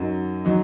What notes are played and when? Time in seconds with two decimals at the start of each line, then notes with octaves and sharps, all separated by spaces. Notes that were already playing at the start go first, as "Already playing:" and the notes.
Already playing: F#2 F#3 D#4
0.45 F#3 D#4